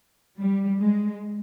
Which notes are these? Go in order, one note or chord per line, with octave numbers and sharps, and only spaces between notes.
G3
G#3